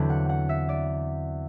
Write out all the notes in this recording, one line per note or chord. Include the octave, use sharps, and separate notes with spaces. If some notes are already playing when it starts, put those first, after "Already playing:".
Already playing: E2 D3 F#3 C4 E4
F#5
F#5
E5
D5